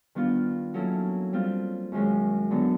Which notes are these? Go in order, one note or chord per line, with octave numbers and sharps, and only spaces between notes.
D#3 G3 B3 D4 F4
F#3 A#3 C#4 E4 A4
G3 C4 F4
F#2 D#3 G#3 C#4
D3 F#3 B3 D4